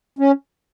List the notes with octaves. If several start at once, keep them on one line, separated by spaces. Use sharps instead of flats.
C#4